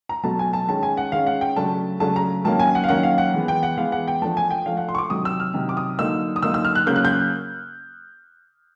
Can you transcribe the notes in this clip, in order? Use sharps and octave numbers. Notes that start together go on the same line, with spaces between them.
A#5
B2 F#3 A3 A5
G#5
A5
D#3 G#3 C#4 A5
G#5
F#5
D#3 G#3 C#4 F5
F#5
G5
C#3 F#3 A3 D4 A5
C#3 F#3 A3 D4 A5
A#5
D#3 F#3 A#3 C#4 A5
G#5
F#5
F5
D#3 F#3 A#3 C#4 F#5
F5
F#5
E3 G#3 B3
G5
F#5
E3 G#3 B3 F5
F#5
G5
F3 A3 D4 A5
G#5
G5
F3 A3 D4 F5
F#5
C6
C#6
D6
C3 D#3 F#3 D#6
E6
F6
C3 D#3 F#3
D6
D#6
D3 F#3 A#3 D#4 E6
D#6
D3 F#3 A#3 D#4 E6
E6
F6
F#6
C#3 F#3 A#3 C#4 G6
F#6
G6